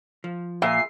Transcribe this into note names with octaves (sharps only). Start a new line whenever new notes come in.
F3
A#2 G#4 E5 C7